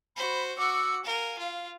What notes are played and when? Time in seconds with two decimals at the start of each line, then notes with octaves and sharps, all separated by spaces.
0.17 F#4 C5 B5
0.58 F#4 F#5 D6 E6
1.05 A#4 F5 G#5
1.39 F4